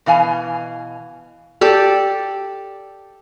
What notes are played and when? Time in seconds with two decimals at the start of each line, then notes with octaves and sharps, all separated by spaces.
0.06 B2 E3 F5 G#5
1.61 G4 A4 D5